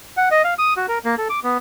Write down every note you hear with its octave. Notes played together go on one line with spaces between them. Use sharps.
F#5
D#5
F5
D#6
F#4
A#4
A#3
A4
D6
B3